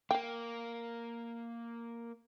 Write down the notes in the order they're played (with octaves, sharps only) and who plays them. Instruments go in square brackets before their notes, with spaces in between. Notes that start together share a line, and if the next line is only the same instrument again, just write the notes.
[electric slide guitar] A#3 [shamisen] F5 G5